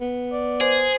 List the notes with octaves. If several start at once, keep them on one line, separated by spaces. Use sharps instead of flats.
B3
D5
G#4 C5